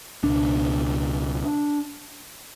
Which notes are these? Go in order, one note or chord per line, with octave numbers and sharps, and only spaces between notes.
C#2 B2 D4